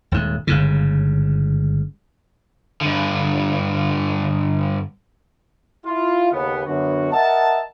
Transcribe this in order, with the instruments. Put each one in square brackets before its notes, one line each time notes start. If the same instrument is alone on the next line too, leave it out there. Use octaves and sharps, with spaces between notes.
[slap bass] D#1 G#2
G1 G#2 C#3
[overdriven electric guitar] G2 D3
[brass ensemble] E4 F4
D#2 C#3 B3
F#2 D3 B3 F#4
A#4 D#5 E5 F#5 A5